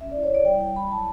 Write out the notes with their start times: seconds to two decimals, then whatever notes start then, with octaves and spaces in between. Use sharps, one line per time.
0.01 C#4 E5
0.11 D5
0.16 E4
0.23 C#5
0.31 E4 D5
0.45 G3 G5
0.61 G3 G5
0.76 E4 B5
0.90 F#3 A5